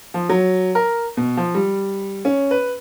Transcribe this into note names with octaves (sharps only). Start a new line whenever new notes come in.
F3
F#3
A#4
B2
F3
G3
C#4
B4